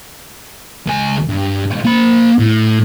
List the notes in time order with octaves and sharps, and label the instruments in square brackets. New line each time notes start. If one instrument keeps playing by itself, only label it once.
[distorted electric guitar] C#2 G#5
G2
A#3 B5
A2